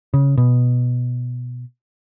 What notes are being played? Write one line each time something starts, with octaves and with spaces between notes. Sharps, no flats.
C#3
B2